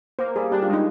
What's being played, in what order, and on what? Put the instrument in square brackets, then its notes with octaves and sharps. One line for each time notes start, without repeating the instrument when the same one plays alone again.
[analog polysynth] A#3 [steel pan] C5
[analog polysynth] G3 [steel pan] G#4
[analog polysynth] D4 [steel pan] G4
[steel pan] F4
[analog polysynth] G#3
[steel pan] D#4